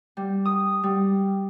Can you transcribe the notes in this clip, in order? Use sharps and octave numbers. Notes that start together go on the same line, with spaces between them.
G3
D#6
G3